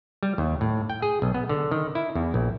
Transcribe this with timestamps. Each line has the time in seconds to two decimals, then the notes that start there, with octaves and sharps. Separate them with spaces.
0.23 G3
0.38 D#2
0.61 A2
0.90 G5
1.02 G#4
1.22 B1
1.34 B3
1.49 D3
1.71 D#3
1.95 E4
2.15 E2
2.34 A#1